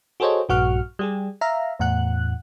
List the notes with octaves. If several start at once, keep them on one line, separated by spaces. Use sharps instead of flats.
F#4 G#4 A4 C5 C#5 D#5
A#1 G2 F#4 F#5 C#6 F6
G3 G4 G#4
E5 F5 A#5
E2 A2 F#5 F#6